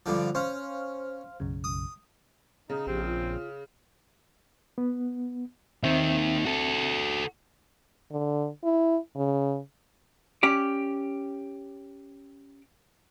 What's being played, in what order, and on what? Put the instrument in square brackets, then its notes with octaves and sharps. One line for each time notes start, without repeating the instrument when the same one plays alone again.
[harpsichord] G2 D3 F3
[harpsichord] C#4 [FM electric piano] C5 F5 F6
[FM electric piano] B1 F#2 C#3
[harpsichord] D#6
[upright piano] C#3 [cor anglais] D#4
[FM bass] A#1 [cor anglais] C4 [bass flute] G4
[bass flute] F4
[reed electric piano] B3
[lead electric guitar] D#2 D#3 [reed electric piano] C4 E5
[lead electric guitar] F#4 A4
[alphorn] D3
E4
C#3
[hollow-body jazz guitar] C#4 G4 D5